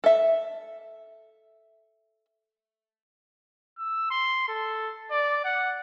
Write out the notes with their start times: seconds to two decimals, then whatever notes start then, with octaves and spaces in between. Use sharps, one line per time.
0.04 A4 E5
3.78 E6
4.11 C6
4.48 A4
5.11 D5
5.44 F#5